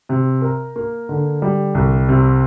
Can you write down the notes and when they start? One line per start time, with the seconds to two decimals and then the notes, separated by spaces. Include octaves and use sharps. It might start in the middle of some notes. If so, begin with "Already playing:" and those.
0.09 C3
0.41 A#4
0.76 A#3
1.09 D3
1.42 G3
1.75 C2
2.09 C3